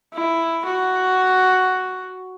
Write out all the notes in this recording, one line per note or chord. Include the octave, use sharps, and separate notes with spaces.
E4
F#4